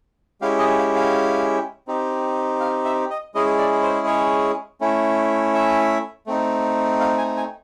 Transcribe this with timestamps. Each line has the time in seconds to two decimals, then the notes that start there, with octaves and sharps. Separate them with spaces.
0.41 G#3 C#4 E4 G4 F5
0.59 D#5
0.78 F5
0.96 F5
1.88 C4 D#4 G4
2.60 F5
2.85 E5
3.10 D#5
3.35 G#3 C#4 E4 G#4 D#5
3.58 D5
3.82 C5
4.07 C#5
4.81 A3 C#4 E4
5.54 E5
6.27 A3 C4 D#4
7.00 F5
7.18 G#5
7.36 G#5